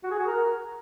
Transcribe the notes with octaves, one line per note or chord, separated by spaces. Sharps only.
F#4
G#4
F#4
A#4